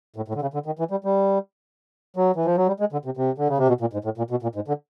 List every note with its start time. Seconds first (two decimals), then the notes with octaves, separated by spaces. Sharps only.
0.16 A2
0.28 A2
0.35 D3
0.42 C#3
0.54 D3
0.66 D#3
0.79 E3
0.91 G3
1.05 G3
2.16 F#3
2.36 E3
2.46 F3
2.57 F#3
2.67 G3
2.80 G#3
2.92 D3
3.05 C3
3.17 C3
3.38 D3
3.48 C#3
3.58 C3
3.68 B2
3.81 A#2
3.93 G#2
4.05 A2
4.18 A#2
4.31 B2
4.43 A#2
4.55 G#2
4.68 D3